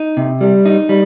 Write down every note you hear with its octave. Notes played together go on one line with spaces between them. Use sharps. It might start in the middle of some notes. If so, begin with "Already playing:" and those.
Already playing: D#4
C3
G3
D#4
G3